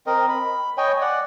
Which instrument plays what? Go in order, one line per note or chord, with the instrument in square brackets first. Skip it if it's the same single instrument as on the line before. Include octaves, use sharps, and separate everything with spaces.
[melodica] C4 A#4 D#5
B5
C#5 D#5 G5 G#5
D5 F#5